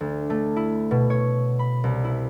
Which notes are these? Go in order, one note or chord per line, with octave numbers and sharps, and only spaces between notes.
D2
A3
E4
B2
C#5
B5
C2
E4